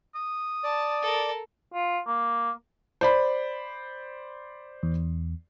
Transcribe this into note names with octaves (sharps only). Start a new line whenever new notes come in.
D#6
D5 A5
A4 A#4
F4
A#3
C5 D5 B5
E2